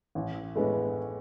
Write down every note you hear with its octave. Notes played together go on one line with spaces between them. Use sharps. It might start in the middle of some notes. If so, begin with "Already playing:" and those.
A1
A2 G#3 B3 D4